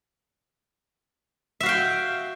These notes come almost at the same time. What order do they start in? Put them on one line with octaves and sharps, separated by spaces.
E5 F#4 F5 G5